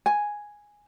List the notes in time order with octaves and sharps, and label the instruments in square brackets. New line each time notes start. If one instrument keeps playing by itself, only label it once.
[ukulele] G#5